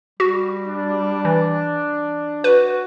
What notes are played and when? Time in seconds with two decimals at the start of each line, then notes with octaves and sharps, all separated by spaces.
0.20 G3 F#4
0.67 D4
1.25 E3
2.44 F#4 B4